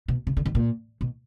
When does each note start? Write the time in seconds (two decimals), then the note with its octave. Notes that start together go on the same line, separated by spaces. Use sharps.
0.08 B2
0.27 C#3
0.37 D3
0.46 D#3
0.55 A#2
1.01 B2